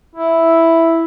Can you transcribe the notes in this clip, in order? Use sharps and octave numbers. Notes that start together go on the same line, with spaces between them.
E4